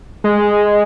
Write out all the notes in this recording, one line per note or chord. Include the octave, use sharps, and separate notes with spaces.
G#3